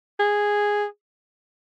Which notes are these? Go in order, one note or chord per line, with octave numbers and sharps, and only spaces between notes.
G#4